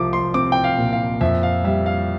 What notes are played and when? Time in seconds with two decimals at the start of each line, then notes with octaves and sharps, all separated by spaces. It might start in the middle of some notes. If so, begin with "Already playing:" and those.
Already playing: C2 F3 D6
0.13 C6
0.34 C4 D6
0.52 G5
0.64 F5
0.78 A#2
0.93 F5
1.21 F2 E5
1.43 F5
1.64 G3 E5
1.86 F5